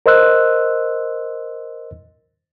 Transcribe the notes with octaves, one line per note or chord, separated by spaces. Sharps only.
A#4 C5 D#5 C6 E6 F#6